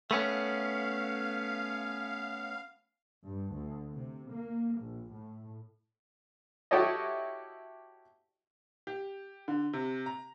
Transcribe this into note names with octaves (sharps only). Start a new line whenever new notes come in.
A3 B3 C#4 F5
G2
D2
C3
A#3
A#1
A2
E4 F#4 G4 A4 C#5 D#5
G4
D3
C3
A#5